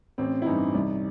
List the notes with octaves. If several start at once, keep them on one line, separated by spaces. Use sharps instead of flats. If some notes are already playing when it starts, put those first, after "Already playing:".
A1 C4
E4
G2 E3 D#4
C2